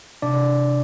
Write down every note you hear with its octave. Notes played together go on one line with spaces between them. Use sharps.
C3 D4 D5